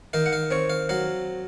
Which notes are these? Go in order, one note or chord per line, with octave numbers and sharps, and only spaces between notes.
D#3 F5
F#5
F5
C4 C#5
F5
F#3 F5